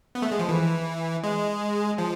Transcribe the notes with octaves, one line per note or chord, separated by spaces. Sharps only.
B3
A3
G#3
F3
E3
G#3
F3